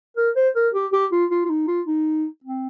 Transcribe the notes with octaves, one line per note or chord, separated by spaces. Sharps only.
A#4
C5
A#4
G4
G4
F4
F4
F4
D#4
F4
D#4
C4